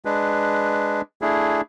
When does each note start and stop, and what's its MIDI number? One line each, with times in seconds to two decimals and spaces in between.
0.05 1.01 56
0.05 1.01 62
0.05 1.01 71
1.22 1.61 57
1.22 1.61 62
1.22 1.61 64
1.22 1.61 68